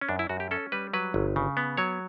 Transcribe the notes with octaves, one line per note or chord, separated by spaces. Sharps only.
C#4
F#2 D4
E4
F#2 F#4
G4
C#4 A4
G3 B4
F#3 B4
G1
C#3
B3
F#3 C#5